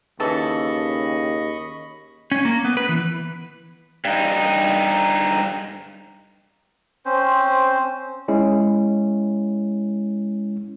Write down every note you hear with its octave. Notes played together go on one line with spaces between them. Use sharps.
D#2 C#3 E3 A4 D#5 B5 C#6
C#4
A#3
B3
B4
E3
G2 D#4
C4 C#4 C5
G#3 C#4 E4